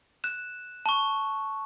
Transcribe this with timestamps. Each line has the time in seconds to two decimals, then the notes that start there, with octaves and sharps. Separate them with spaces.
0.24 F#6 E7
0.86 A5 C#6